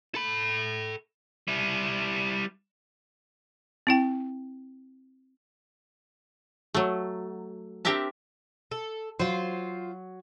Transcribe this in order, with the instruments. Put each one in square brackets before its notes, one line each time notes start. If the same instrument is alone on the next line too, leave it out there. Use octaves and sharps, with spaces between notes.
[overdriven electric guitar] A4 B5
G3 E4
[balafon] C4 E4 G5
[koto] F#3 A3
C4 D4 G4 A#4 E5 A5
[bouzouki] A4
[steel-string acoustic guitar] F#3 [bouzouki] F4 C5